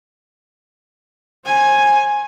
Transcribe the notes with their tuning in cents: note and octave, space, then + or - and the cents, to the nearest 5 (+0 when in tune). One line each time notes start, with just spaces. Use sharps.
C5 +45 G#5 +0